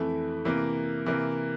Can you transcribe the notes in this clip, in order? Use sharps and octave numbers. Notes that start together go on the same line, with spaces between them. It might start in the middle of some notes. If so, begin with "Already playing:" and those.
Already playing: F2 E3 A3 E4
C3 E3 A#3
C3 E3 A#3